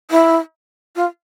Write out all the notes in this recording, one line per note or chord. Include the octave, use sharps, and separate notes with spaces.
E4
F4